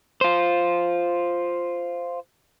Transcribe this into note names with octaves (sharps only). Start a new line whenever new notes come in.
F4 C5